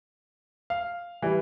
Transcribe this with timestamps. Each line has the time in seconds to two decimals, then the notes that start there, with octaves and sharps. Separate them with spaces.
0.70 F5
1.22 E3 G3